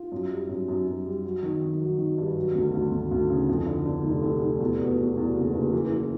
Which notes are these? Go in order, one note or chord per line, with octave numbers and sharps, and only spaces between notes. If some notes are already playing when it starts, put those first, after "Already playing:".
Already playing: F4
F#2
G3
F#2
F#2
F#2
G3
F#3
D#3
D#3
F#3
D#3
G2
F#3
D2
D2
D2
D2
C#3
F2
D3
D3
F1
F1
F1
E2
B2
B2
E2
F#1
F#1
E3
E3